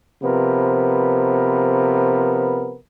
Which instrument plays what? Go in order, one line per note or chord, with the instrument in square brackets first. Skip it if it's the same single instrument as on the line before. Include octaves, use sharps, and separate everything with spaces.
[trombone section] C3 F3 B3 A#4 B4